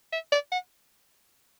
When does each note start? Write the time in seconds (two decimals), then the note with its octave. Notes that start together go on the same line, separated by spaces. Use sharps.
0.12 E5
0.32 D5
0.52 F#5